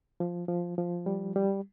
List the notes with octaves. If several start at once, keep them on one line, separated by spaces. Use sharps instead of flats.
F3
F3
F3
G3
G3